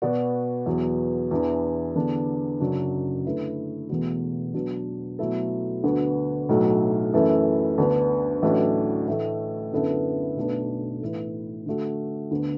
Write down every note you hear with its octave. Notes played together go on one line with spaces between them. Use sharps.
B2 B3 F#4 D5
E2 B2 F#3
E2 E3 D4
E2 D3 B3 D4
F#1 F#2 F#3 D4
D3 A3 E4 B4
E1 E2 B2 A3 F#4
B2 F#3 D4 B4
B2 F#3 A3 E4 A4
D2 D3 B3 F#4
B1 A2 F#3 A3
F#2 E3 A3 E4 A4
D2 D3 B3 D4 B4
A1 A2 F#3 D4 B4
A2 E3 A3
F#2 D3 B3 E4 A4
B1 B2 A3 D4 B4
A2 E3 B3 E4 B4
D3 A3 F#4
D2 D3 B3